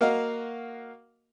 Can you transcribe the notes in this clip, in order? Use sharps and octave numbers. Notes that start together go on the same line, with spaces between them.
A#3 F#4 A#4 D#5 F5